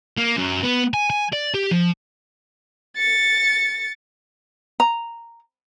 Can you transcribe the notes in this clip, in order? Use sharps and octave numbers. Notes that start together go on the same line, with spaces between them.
A#3
F#2
B3
G#5
G#5
D5
G4
F3
A6 C#7
A#5